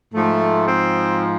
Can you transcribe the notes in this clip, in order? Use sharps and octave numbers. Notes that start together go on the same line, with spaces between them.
G#2 F3 A3
C4